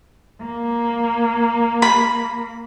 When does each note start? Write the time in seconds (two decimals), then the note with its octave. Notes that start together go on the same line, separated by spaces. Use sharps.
0.43 A#3
1.82 B5